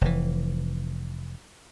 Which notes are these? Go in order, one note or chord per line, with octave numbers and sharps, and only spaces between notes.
F1 E3